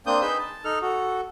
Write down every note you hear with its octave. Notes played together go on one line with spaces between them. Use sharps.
A#3 C4 D4 D#6 G6
D#4 G#4 B4 E6 G6
A5
D#4 A4 F6
F#4 A4